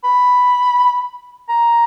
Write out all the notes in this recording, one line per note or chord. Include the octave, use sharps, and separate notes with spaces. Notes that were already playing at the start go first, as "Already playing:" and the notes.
B5
A#5